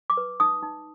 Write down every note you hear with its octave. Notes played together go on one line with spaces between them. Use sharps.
D6
B4
D#4 D#6
D#4